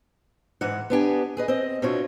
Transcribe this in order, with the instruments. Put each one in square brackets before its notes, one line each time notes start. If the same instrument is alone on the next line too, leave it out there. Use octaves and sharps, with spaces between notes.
[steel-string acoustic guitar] G#2 E3 G#3 F#5
B3 D4 G4 G#5
G#4 B4 D#5
C4 D#5
B2 C4 D4 E4 F4 C#5